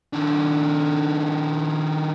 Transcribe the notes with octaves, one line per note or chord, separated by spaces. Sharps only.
D#3 D4